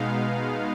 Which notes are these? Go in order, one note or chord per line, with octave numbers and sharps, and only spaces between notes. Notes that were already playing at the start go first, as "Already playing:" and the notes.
Already playing: B2 G#3 B3 D#4 F5